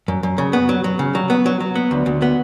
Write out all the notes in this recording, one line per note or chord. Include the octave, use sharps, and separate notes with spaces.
F#2
F#2
C#3
B3
F#3
F#3
C#3
F#3
B3
F#3
F#3
B3
D2
D2
B3